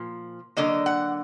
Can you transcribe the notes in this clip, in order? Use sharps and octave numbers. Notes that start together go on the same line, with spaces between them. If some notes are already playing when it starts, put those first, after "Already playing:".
Already playing: A#2 F3
D3 F#3 A#3 D#5
F#5